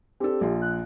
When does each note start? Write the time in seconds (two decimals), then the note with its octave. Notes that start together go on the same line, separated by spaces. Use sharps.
0.20 C4 D4 G4 A4
0.41 A#1 F4
0.62 F#6